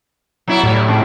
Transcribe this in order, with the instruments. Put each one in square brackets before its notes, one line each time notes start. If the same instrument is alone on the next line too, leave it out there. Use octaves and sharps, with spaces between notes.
[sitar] F#3 B3 E4
[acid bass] A2 [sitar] G3
[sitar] F2 G#2